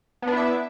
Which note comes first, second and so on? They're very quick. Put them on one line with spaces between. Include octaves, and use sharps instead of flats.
B3 D4 E4 E5